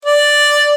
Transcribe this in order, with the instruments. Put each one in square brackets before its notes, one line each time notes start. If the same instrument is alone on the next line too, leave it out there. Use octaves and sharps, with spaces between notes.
[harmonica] D5